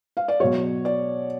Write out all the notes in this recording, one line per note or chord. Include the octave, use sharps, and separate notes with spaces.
F5
D5
B2 F#3 C#5
D5